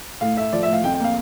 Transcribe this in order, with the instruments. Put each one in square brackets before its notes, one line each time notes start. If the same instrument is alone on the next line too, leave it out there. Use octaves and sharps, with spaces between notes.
[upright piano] A2 [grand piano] F5
[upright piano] A3 [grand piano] E5
[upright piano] F3 [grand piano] D5
[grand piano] E5
[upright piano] A2
[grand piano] F5
[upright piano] F2 [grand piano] G5
[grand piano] G5
[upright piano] A#3 [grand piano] F5